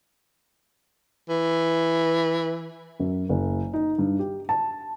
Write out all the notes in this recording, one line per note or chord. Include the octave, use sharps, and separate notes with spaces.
E3
F#2
F#1
D#4
G2
G4
A5